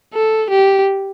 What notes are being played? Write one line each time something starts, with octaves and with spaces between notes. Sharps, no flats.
A4
G4